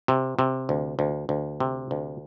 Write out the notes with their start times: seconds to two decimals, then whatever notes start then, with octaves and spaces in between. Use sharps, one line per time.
0.08 C3
0.39 C3
0.69 D2
0.99 D2
1.29 D2
1.60 C3
1.91 D2